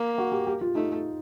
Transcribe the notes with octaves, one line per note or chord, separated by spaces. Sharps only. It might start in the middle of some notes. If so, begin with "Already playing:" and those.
Already playing: A#3
F#4
G4
G4
F4
A3 D#4